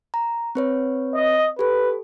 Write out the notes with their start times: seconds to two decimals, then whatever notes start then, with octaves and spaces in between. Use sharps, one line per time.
0.14 A#5
0.55 C4 B4 C#5
1.14 D#5
1.59 G4 A4 B4